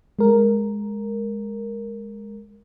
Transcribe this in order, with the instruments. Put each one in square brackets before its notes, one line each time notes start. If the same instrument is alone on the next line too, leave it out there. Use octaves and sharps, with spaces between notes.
[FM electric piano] G#3 A#4